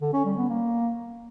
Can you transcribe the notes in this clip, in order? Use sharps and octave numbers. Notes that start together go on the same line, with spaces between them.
D3
C#4
G3
B3
A#3